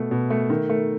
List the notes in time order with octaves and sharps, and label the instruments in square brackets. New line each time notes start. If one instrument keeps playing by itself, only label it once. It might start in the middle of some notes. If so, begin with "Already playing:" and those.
Already playing: [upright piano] B2 A3
B2
A3
D#3
A3